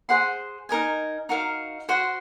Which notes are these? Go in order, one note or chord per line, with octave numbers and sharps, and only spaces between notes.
G#4 C5 F#5 C6
D#4 A#4 D#5 G#5
D#4 F#4 A#4 F5
F#4 C5 F#5 C6